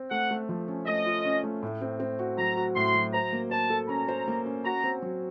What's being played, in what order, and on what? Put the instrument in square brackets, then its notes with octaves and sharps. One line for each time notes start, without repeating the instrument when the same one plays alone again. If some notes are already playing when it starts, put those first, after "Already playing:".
Already playing: [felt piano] C4
[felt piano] A3 [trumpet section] F#5
[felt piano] A3
F3
C#4
[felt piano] A3 [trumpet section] D#5
[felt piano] F4
C#4
A3
A2
C4
C4
F#4
[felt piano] F#3 [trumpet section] A#5
[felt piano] F#4
[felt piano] A2 [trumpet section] C6
[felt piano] F#3
[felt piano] C5 [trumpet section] A#5
[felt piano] A#3
[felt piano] C5 [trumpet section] A5
[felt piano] A4
[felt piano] C#4 [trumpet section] A#5
[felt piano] C5
A#3
C#4
[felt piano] F#4 [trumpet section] A#5
[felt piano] C4
F#3